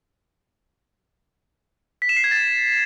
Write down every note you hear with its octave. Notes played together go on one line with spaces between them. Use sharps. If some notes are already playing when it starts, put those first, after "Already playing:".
B6
E7
C7
G#6
A6